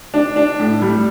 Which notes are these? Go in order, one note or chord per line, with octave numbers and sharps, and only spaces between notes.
D4
D4
A2
G3